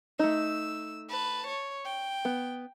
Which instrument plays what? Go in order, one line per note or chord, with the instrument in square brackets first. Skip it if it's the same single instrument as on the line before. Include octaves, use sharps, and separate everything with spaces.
[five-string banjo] A3 D#4 [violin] E6
[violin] B4 A5
C#5
G5
[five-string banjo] B3